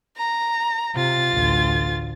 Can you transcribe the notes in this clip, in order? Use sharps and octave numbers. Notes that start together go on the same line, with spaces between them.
A#5
C3 F4 A6
A1 D2